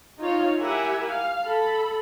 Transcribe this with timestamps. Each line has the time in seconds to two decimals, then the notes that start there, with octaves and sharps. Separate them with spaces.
0.20 D#4 F4 C#5 F5
0.59 E4 G4 A#4 E5 F#5 G#5
1.12 F5
1.45 A4 B5